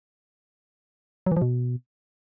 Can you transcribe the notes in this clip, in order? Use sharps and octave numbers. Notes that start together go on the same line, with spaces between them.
F#3
E3
F3
B2